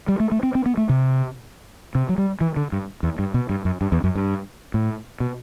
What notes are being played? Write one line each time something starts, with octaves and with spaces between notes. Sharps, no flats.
G3
A3
A3
C4
C4
B3
A3
C3
C3
F#3
G3
E3
D3
G2
E2
G2
B2
G2
F#2
G2
E2
F#2
G2
A2
B2